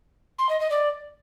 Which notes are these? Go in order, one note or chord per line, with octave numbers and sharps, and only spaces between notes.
C6
D#5
D#5
D5